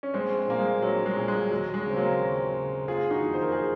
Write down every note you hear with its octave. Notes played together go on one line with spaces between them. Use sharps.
C#4
A#1 G#3 C4
A#2 A#3
G#3
A#1 F#3
G#3
A#2
G#3
D#2 F#3
G#3
C#3 C4
F#3 A#3
D#2
C#3
F#1 F4 G#4
D#4 F#4
F2 D#3
C5
A#4
G#4